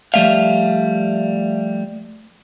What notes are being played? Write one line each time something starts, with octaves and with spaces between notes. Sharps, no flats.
F3 G3 A3 E5 F5